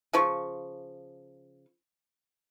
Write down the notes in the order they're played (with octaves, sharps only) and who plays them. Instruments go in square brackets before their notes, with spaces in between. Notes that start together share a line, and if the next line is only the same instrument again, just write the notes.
[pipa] C#3 F3 C#6